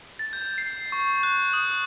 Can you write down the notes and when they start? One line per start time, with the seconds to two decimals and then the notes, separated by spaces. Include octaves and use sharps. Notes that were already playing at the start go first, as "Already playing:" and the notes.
0.19 A6
0.33 G6
0.58 C7
0.92 C#6
1.23 F#6
1.53 D#6